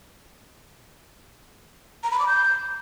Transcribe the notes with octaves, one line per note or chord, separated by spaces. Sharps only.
A#5
B5
D6
G6